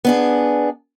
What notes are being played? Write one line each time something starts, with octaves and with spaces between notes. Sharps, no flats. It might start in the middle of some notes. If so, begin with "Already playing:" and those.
B3 D4 G#4